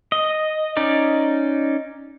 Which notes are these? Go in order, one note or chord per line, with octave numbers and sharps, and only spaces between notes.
D#5
C#4 D#4 D5